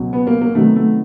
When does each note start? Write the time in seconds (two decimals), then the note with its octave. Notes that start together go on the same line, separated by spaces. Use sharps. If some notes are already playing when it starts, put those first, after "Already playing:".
Already playing: C#2 B2 F#3
0.13 B3
0.27 A#3
0.41 A#3
0.55 C3 D#3 F#3 A3 B3 D#4
0.76 A3